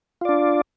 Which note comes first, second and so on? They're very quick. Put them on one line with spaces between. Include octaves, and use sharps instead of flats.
F4 D5 D4